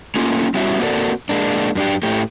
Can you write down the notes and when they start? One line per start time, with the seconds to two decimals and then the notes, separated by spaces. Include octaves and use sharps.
0.16 A3 A#3 C#4 F4
0.54 G3 B3 C#4 E4 F#4 E5
0.80 A#3 C4 F#4 A4 A#4 D5
1.29 G#3 A#3 D4
1.75 F#2 D4 G4
2.03 A2 A3 G4